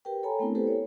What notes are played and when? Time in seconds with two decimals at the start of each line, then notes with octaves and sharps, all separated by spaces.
0.05 G4 A#4 B4 G5
0.23 A4 C#5 G5 G#5 A#5 B5
0.39 A3 B3 C4 D4 E4 A#4
0.55 E4 G4 A4 B4 C5
0.67 C#5